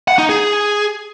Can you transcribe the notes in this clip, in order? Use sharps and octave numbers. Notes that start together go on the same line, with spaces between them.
F#5
D#4
G#4